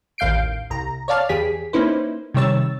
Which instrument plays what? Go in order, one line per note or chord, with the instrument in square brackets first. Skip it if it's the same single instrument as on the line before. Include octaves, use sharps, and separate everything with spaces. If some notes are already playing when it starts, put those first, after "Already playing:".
[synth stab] A1 D#2 F5 G6 C7 D7
C2 A#5
C#5 D5 F5 A5 F6
E2 G4 G#4 B6
A#3 C#4 D#4 E4 B4 C5
C3 D#3 G3 C#5 E6 A6